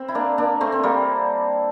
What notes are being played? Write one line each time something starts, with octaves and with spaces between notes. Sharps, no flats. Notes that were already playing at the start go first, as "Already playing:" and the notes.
Already playing: C4
E4
A#3 D4
A#3 D4
A3 C4
C4
G3 A#3